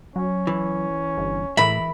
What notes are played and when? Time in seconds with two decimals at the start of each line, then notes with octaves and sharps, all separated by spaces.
0.16 F#3 C#4
0.47 E3
1.18 G1
1.57 A2 E3 A#4 E5 B5